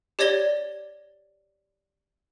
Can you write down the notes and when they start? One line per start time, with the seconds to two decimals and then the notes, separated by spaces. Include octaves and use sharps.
0.19 G4 C#5 D5 G#6 A#6 G7